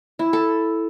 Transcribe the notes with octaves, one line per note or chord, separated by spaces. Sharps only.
E4
A4